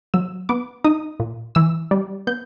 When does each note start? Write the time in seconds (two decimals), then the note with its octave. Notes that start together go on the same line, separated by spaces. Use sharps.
0.14 F#3 E6
0.49 B3 D6
0.84 D#4 D#6
1.20 A#2
1.55 E3 E6
1.91 G3
2.27 B3 G6